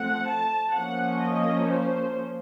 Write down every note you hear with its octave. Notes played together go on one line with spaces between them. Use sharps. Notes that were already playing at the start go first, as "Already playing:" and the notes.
Already playing: F3 A3 C4 F#5
A5
F3 A#3 C#4 F#5
D#5
C5